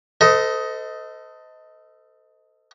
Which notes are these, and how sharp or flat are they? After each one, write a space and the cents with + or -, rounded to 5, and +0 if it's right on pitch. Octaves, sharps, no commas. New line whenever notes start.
A4 +20 C5 -35 D#5 +15